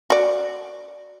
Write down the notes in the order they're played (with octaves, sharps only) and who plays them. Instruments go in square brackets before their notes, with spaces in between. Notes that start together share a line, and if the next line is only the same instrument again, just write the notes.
[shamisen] F#4 D5